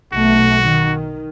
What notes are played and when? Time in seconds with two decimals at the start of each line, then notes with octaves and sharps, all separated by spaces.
0.13 B1 A3 F#4
0.64 D#3